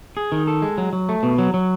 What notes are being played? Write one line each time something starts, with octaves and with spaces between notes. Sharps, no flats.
G#4
D#3
A4
G#3
F#3
F#3
A3
B2
F#3
F#3